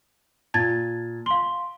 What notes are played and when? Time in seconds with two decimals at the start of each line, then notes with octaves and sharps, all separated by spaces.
0.54 A#2 A5 G#6 A6
1.26 F5 C6 G7